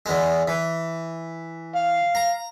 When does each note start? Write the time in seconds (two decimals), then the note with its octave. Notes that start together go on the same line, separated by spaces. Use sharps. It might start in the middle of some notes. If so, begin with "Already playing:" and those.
0.06 E2 G#3
0.48 E3
1.76 F5
2.15 A#5